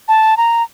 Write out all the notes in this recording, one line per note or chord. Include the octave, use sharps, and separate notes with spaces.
A5
A#5